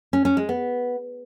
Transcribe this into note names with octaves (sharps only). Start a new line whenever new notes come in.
C#4
C#4
G#3
B3